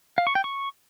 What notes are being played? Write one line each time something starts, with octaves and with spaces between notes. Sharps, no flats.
F5
C#6
G5
C#6